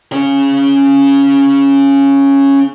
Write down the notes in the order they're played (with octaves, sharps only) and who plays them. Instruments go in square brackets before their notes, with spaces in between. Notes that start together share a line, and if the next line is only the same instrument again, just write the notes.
[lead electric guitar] C#4 G#4